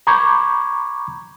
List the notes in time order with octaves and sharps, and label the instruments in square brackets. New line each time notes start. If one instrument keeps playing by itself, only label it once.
[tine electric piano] A#5 B5 C#6 D6 G6 G#6